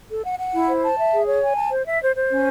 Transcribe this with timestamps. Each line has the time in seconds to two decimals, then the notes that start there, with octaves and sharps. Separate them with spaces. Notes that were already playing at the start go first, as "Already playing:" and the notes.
0.09 A4
0.24 F#5
0.39 F#5
0.53 E4
0.68 C5
0.83 A5
0.98 E5
1.12 G#4
1.26 C#5
1.42 G#5
1.57 A5
1.71 C5
1.86 E5
2.01 C5
2.15 C5
2.31 C#4